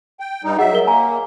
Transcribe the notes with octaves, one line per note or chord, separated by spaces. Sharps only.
G5
G2 G3 D#4
F#3 G#4 D#5 E5 F#5
G#4 A#4 G7
A#3 G#5 A#5